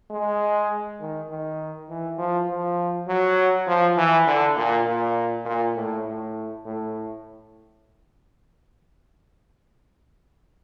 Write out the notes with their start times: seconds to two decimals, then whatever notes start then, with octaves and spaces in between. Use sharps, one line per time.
0.10 G#3
1.00 D#3
1.30 D#3
1.89 E3
2.18 F3
2.48 F3
3.08 F#3
3.67 F3
3.97 E3
4.27 D3
4.56 A#2
4.86 A#2
5.45 A#2
5.76 A2
6.05 A2
6.65 A2